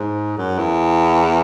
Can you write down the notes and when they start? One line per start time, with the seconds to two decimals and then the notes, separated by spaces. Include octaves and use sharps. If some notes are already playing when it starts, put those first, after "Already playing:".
Already playing: G#2
0.38 F#2
0.58 E2